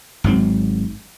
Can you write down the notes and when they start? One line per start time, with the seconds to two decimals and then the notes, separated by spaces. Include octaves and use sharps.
0.24 G#1 G#2 F#3 C4